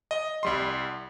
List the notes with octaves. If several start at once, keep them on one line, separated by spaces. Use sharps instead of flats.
D#5
C2 G3 C6